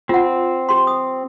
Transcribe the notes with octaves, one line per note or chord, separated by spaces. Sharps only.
C4 F4 F#5
G4 C6
D#6